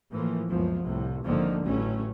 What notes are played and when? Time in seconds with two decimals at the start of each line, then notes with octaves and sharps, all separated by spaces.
0.11 A2 E3 F3 A#3
0.49 C#2 F#2 A#2 F3 B3
0.82 C2 A2 C3
1.25 G#1 F2 D3 D#3 F3 A#3
1.65 A1 A2 F#3 A3 C#4